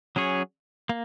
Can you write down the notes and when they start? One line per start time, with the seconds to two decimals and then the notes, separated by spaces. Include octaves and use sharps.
0.16 F#3 C#4 G#4 C#5
0.89 A#3